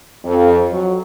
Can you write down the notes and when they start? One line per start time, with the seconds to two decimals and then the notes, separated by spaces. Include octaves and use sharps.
0.24 F2
0.71 F#3